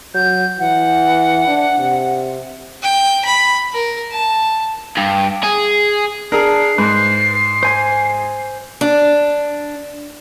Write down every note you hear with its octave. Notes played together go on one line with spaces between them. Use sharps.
F#3 G6
E3 F#5
D4
C3
G5
B5
A#4
A5
G2
G#4
D4 G#4 A#4 C7
G#2 B4 C5
C5 G#5 C6
D4